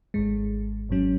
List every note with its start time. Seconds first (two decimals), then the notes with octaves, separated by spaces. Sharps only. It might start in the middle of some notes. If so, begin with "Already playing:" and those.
0.14 G#1 G#2 G#3
0.89 G#1 G#2 F#3 C#4